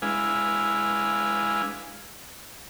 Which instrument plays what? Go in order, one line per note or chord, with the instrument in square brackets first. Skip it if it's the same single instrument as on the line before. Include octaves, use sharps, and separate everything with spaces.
[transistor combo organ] G#3 D4 E4 B4 F5 G#5